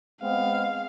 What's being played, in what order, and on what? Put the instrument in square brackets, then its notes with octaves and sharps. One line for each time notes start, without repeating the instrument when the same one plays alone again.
[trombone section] G#3 B3 C4 [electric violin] F5